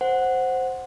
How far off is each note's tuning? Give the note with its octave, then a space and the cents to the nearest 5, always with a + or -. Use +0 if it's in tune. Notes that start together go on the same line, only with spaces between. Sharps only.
C5 +0 F#5 +0